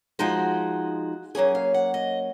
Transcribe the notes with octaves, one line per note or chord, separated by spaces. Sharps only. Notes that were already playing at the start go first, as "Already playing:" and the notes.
F3 G#3 D#4 F#4
F#3 A#3 C#4 G#4
F5
F#5
D#5